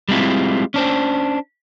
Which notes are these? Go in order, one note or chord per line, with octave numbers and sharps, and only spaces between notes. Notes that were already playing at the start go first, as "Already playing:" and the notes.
G3 G#3 C4 E4 F4
C#4 D4 C5